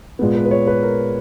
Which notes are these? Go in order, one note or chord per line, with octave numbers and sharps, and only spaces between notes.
A#2 G#3 B3
B4
B4
C#5
B4
A#4